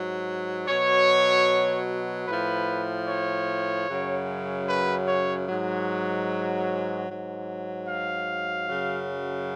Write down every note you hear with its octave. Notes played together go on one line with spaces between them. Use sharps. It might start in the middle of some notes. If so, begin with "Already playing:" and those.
Already playing: G#2 F#3
B2 F#3 C#5
A2 F3 B4
C#5
F#2 C#3 F#3
B4
C#5
G#2 F#3
G#2 F#3
F5
F#2 C#3 F#3